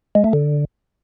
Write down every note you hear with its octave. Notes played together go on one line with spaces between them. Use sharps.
G#3
A3
D3